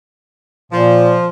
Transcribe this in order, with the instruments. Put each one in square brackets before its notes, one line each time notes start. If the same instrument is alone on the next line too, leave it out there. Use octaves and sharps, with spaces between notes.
[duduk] A#2 [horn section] F3